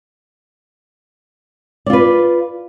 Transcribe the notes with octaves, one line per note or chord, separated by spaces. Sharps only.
F4 B4 D5